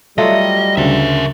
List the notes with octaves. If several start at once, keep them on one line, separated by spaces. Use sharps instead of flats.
F#3 G3 A3 F4 D#5
D2 C#3 A#4 E5